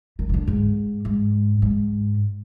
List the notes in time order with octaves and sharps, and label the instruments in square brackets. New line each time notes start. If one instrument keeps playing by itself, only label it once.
[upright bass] D#3
D#3
D3
G#2
G#2
G#2